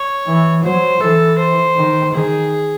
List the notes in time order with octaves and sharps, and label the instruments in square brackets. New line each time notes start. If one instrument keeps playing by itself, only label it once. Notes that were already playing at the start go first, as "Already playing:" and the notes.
Already playing: [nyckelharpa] C#5
[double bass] E3
[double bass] F#3 [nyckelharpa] C5
[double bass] E3 [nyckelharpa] A4
[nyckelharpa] C5
[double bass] D#3
[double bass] D#3 [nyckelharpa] G#4